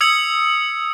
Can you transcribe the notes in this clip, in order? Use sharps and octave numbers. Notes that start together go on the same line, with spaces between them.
D#6 E6 G#6 C#7 F#7